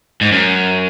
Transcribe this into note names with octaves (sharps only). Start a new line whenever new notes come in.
G#2
F#2